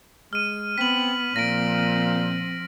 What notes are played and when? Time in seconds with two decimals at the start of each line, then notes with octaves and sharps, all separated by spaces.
0.33 G#3 F6 D#7
0.78 B3 C4 B6 F#7
1.36 A#2 F3 C4 A#6 D7